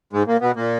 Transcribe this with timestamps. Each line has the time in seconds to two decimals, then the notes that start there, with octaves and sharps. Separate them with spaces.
0.13 G#2 G#3
0.27 A#2 A#3
0.41 B2 B3
0.56 A#2 A#3